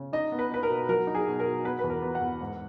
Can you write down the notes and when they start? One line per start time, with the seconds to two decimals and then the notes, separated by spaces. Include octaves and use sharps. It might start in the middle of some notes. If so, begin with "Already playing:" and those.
Already playing: C#3
0.13 D#4 D#5
0.32 B3
0.39 B4
0.51 D#4 B4
0.63 A#4
0.69 B2
0.89 F#3 A#4
1.07 D#4
1.15 G#4
1.27 B2
1.39 A#4
1.46 B2
1.65 B3 B4
1.79 E2 B4
1.90 A#4
2.02 B3
2.15 F#5
2.21 E2
2.40 G#2